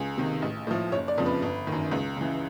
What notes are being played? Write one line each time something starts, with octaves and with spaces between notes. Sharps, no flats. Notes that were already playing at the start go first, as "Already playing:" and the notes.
Already playing: C#2 G#4
C3 D#3
A1
A2 F3
F#1 C#5
D5
F2 C#3 F3
B4
G1
D#3
F#2
C#2
C#3 E3